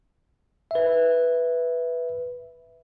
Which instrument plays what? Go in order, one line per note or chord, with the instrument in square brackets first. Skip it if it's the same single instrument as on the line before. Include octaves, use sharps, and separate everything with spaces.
[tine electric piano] B4 E5